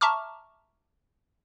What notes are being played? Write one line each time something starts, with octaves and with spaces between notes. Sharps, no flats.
E5 A5 A#5 C#6 D6 F6